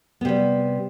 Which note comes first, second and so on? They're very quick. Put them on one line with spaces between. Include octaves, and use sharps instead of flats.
B3 C3 G3